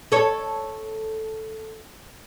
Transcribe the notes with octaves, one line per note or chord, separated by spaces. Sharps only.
A4 C#5